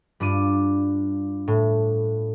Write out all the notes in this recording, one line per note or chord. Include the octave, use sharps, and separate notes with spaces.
G2 D4 F4 D6 D#7
A2